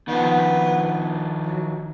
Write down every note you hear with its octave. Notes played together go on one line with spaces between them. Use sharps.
D#3 F3 B3
F#3